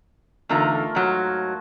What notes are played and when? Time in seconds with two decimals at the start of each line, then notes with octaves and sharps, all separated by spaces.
0.49 E2 D3 A3 D#4 F4 A#4
0.95 G#2 F#3